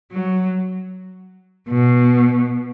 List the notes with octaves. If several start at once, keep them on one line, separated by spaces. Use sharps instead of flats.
F#3
B2